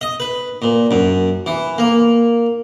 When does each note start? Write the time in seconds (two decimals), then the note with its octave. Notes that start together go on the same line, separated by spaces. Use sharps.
0.01 D#5
0.20 B4
0.62 A#2
0.91 F#2
1.46 E3
1.78 A#3